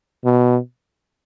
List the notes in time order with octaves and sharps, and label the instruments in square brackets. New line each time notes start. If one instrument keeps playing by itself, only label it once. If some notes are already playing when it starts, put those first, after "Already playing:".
[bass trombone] B2